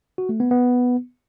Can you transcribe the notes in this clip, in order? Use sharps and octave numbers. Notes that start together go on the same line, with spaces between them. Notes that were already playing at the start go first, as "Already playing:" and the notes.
F#4
A3
B3
B3